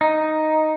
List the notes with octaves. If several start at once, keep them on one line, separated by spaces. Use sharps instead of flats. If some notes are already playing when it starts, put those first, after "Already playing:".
D#4